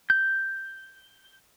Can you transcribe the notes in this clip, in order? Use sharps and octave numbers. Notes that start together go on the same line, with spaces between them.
G6